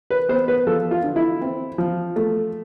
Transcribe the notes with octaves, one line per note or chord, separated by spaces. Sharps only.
B4
B3 C5
B4
F3 A4
F4
D3
E4
C4
F3
A3